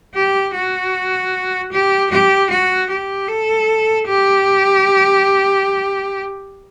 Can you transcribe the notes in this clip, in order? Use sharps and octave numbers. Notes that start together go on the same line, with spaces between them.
G4
F#4
G4
G4
F#4
G4
A4
G4